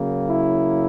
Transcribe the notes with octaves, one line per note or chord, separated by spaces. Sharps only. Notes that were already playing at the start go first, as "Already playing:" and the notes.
Already playing: C#3 F#3 A#3
E4